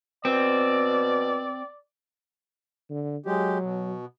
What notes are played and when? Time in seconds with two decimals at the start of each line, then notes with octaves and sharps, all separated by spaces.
0.25 B2 C4 D5
2.90 D3
3.26 F#3 G#3 G4
3.62 B2